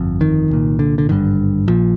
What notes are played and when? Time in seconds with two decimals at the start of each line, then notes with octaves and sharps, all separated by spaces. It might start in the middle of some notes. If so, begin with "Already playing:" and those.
Already playing: G1 F2
0.21 D#3
0.50 C2 A#2
0.79 D3
0.98 D3
1.09 G#1 G2 D3 D#3
1.68 A#1 A#2 F3